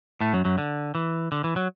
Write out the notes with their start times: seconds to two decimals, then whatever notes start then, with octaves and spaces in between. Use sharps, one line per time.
0.21 A2 A3
0.33 F#2 F#3
0.45 F#2 F#3
0.58 D3
0.95 E3
1.32 D3
1.44 E3
1.56 F#3